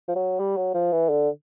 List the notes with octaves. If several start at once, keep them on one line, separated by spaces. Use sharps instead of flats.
F3
F#3
G3
F#3
F3
E3
D3